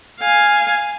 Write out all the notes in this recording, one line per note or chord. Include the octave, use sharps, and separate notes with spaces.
F5 G#5